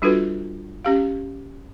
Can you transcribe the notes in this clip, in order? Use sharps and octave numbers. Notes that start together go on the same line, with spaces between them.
G3 D4 F4 F#4 A4 B4
C#4 G4 F5